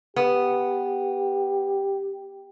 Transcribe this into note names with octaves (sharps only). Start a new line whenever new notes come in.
B3 G4